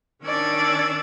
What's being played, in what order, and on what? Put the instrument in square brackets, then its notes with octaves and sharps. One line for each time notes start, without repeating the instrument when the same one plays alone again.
[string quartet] D#3 C#4 D4 D5 E6 G#6